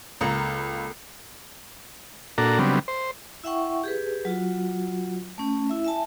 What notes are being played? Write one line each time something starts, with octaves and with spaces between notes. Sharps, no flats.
C#2 A#3 A4 A#5
A#2 D4 F#4 A4 A#5
C#3 F#3 G3 B3 C4 D4
C5
E4 E5 F#5 G5 C#6
G4 G#4 B4
F#3 F4 F#4
A3 C#4
E4 E5
E5 G#5 A5